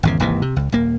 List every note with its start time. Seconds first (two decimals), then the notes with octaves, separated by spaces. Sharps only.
0.03 G#1 E2 C#3
0.20 G#1 D#2 C3 E3
0.42 C3
0.56 C#2
0.72 D#1 A#3